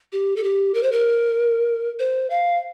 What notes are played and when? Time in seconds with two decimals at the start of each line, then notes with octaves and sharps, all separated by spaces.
0.12 G4
0.36 A4
0.44 G4
0.74 A#4
0.83 C5
0.92 A#4
1.99 C5
2.30 F5